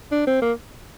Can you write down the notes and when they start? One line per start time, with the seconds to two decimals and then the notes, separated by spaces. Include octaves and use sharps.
0.12 D4
0.27 C4
0.42 A#3